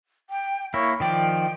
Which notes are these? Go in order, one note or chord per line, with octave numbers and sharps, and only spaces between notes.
G5
A#3 E4 C#5
D#3 F3 D5 G5